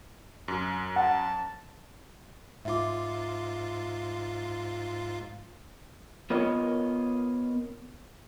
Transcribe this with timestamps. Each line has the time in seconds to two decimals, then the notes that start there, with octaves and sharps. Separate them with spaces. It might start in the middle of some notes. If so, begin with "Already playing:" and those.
0.48 F#2
0.96 F#5 A5
2.65 G#2 F4 E5 D6
6.30 B3 F4 A#4 C#5 D#5